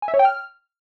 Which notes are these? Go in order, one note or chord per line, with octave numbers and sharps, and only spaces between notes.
G#5
E5
C#5
G5
F6